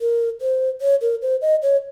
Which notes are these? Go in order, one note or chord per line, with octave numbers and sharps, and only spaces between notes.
A#4
C5
C#5
A#4
C5
D#5
C#5